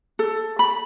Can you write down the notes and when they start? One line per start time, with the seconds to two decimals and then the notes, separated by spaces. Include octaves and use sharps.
0.19 A4
0.59 B5